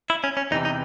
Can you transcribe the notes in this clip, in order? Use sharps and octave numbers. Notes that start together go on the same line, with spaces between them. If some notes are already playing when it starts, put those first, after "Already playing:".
E4
C#4
C#4
E2 C3 E3 D#4
D#4